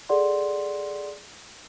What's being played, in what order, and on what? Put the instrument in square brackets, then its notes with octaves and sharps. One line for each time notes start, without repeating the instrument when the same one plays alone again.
[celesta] G#4 A4 D5 F#5 C6